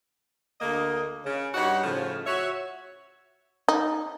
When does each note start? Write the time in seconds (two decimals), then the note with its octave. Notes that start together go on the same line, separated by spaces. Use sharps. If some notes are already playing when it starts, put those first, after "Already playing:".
0.61 D2 D3 A#3 D#5
1.25 C#3
1.54 G2 G3 D#4 F#4 C#5 F#5
1.83 A2 C#3 F3
2.26 F#4 C#5 E5
3.68 D#4